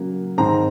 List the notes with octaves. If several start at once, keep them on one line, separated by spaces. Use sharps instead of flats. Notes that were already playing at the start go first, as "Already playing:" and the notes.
Already playing: C#3 F#3 A#3
G#2 D#3 G#3 C4 A#5